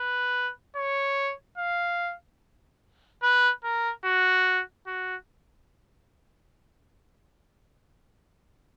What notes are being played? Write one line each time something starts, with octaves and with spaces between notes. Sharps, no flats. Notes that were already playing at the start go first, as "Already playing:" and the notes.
Already playing: B4
C#5
F5
B4
A#4
F#4
F#4